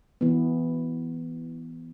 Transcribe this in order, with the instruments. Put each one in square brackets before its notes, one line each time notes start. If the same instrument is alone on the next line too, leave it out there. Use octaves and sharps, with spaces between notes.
[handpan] E3 B3